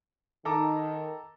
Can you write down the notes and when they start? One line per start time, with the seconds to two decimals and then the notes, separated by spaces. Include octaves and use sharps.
0.45 D#3 A4 A#5 D6